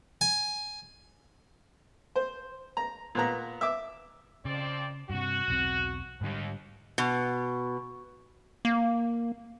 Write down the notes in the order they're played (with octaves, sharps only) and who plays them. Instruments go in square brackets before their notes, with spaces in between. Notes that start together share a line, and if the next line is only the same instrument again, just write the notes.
[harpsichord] G#5
[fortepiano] C5
A#5
A#2 B3 A#5
E5 D6
[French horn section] F2 C4 D5 [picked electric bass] C#3
[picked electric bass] G2 C3 [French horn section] F#4
[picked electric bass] E1 B1 C4
[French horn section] D#2 [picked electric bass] G#2 D3 G3
[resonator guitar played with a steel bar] B2
[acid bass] A#3